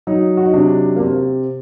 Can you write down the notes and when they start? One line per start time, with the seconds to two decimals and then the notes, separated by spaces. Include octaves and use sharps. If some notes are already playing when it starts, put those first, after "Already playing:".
0.07 F#3 D#4
0.37 F#4
0.46 D#4
0.54 C3 D4
0.96 A#3
1.00 C3 C4